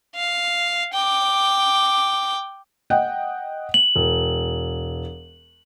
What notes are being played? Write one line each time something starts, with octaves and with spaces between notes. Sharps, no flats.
F5
G5 D6
D#5 F#5 G5
F#7
E1